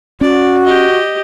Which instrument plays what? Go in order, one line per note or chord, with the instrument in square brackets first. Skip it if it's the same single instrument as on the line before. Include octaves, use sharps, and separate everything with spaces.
[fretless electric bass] C#4 [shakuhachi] F#4 [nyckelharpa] D5
[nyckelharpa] G4 D#5